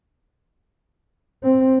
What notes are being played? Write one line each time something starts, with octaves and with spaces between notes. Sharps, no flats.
C4